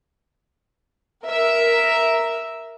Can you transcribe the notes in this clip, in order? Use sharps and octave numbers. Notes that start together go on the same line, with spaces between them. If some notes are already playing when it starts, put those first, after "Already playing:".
A#4 E5